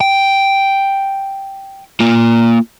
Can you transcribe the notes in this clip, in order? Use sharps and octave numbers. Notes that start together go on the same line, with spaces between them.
G5
A#3 F4